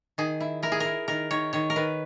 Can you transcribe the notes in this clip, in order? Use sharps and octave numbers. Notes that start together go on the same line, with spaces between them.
D#3 G#4
E4
E4 A#4
G#4
E4 A#4
D#3 A#4
D#3 C#5
D#3 C#5
A#4
D#3 B4